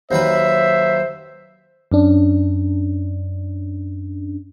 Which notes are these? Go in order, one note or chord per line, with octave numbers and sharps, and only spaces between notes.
D#2 F#3 B4 C5 E5
F#2 C#4 D4